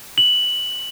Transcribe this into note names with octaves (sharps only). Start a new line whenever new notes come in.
F#7